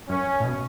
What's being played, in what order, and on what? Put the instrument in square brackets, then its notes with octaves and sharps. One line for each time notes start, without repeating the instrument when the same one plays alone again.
[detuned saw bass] F#2 [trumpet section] C#4
[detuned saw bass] A2
B2